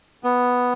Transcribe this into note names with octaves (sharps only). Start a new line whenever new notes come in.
B3